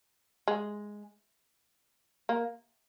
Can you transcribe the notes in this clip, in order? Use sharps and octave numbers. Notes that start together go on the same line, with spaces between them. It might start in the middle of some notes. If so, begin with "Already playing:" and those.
G#3
A#3